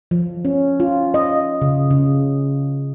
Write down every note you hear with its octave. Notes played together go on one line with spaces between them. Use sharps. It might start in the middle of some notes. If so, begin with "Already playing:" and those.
F3
C#4
F4
D#5
C#3
C#3